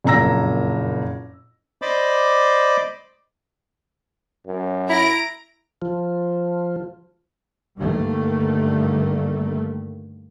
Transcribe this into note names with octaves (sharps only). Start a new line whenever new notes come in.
F#1 F2 A#2 A#5 E6 A#6
C5 D5 D#5 B5 D6
F#2
E4 A#5 A#6 D7
F3
G2 D3 D#3 G3 A3 A#3